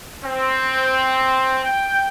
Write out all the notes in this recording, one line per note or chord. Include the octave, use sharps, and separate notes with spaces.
C4
G5